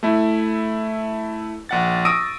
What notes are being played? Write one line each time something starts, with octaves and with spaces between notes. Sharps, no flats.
A3 E4
A#1 F#5 A6
C#6 D#6 E6 A#6 D7 D#7